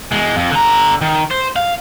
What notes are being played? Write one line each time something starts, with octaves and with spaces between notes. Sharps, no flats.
E2 G#3
F2
D3 A#5
D#3
C5
F5